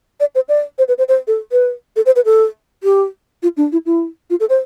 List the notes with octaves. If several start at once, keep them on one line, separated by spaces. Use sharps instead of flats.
D5
C5
D5
C5
B4
C5
C5
A4
B4
A4
C5
B4
A4
G4
F4
D4
E4
E4
F4
A4
C5